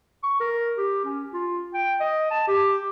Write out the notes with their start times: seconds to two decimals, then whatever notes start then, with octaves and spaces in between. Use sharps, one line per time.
0.23 C#6
0.40 A#4
0.78 G4
1.05 C#4
1.33 F4
1.74 G5
2.00 D#5
2.31 A5
2.48 G4